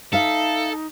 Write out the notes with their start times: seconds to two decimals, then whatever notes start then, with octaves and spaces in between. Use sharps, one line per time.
0.13 D#4 A4 E5 F5